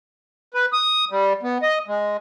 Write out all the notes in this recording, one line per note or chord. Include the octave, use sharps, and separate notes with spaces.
B4
D#6
G3
B3
D#5
G#3